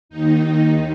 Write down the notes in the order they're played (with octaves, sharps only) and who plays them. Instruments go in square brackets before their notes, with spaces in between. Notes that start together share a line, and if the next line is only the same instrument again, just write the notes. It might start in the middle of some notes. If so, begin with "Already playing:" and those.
[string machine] D#2 D#3 D#4